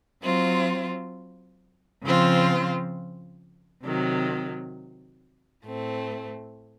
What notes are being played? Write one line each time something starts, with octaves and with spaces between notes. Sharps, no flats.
F#3 C4 F4
C#3 F3 C4 F4 C5
C3 D#3 F#3
A2 A3 C4